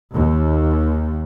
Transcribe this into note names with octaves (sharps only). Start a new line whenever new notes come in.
D#2